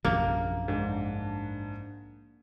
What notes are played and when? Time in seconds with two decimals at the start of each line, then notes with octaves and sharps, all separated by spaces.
0.05 A#1 F#2 C3 A#3
0.68 G#2 D4